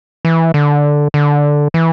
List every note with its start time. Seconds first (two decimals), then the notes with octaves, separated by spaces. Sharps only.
0.25 E3
0.54 D3
1.14 D3
1.74 E3